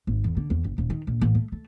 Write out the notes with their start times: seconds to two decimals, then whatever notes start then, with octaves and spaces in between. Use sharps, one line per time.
0.07 G#1
0.24 E2
0.37 D3
0.50 E2
0.64 F#1
0.78 D#1
0.90 D#3
1.07 A#1
1.21 A1
1.35 A3
1.52 A3